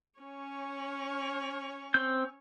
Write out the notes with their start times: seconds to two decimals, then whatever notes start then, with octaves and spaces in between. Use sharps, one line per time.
0.20 C#4 C#5
1.94 C4 G6